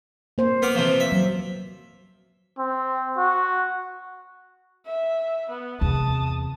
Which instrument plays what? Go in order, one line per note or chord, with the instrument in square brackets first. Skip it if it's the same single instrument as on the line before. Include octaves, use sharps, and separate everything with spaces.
[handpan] A#3 C5
[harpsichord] B3 F5 D6
C3 E3 F3
E5
[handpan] F#3
[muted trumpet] C4
F#4
[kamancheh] E5
B3
[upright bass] E2 C3 [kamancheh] A5 D#6